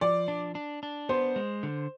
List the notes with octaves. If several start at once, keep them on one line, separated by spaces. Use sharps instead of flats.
F3 D5
D4
D4
D4
B3 C5
G#3
D3